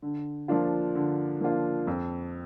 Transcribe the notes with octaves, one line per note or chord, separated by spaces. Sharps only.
D3
F3 A#3 D4 F4
D3
F3 A#3 D4 F4
F2